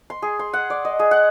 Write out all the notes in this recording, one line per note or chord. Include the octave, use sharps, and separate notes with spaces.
C6
G#4
C6
F#5
D5
D#5
G#4
F#5